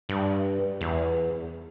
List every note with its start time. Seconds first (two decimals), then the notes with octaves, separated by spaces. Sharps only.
0.09 G2
0.81 E2